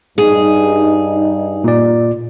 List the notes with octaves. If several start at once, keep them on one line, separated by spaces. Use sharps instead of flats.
G2 D#4 G#4
A#2 D5